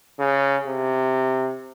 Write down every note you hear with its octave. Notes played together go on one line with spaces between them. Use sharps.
C#3
C3